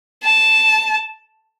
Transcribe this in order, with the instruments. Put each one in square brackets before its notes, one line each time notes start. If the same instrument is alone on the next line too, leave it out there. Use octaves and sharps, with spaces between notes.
[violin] A5